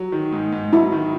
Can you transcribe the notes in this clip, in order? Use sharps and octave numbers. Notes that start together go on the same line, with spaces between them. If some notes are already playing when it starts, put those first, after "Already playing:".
Already playing: F#3
D#3
G#2
G#2
F#3 E4
D#3